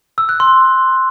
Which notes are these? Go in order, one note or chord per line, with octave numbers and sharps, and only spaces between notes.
E6
F#6
C6